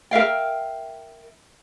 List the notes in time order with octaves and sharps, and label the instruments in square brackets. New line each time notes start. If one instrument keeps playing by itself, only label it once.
[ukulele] A#4 E5 F5 G5